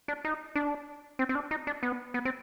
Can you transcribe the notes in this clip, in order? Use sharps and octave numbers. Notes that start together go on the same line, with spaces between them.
D4
D#4
D4
C4
C4
D4
D#4
D4
B3
B3
C4